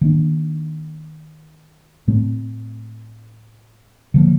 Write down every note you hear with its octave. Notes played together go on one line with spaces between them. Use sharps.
D#3 A#3 D4
A2 A3 C4
D3 F3 A#3